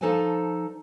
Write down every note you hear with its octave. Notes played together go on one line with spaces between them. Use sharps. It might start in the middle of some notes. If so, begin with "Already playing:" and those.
F3 D#4 A4 C5 D5 G#5